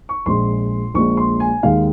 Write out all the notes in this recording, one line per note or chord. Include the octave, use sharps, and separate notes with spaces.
C#6
A#1 A#2 G#3 C6
A#1 A#2 G#3 C#6
C6
G#5
D#2 D#3 G#3 F5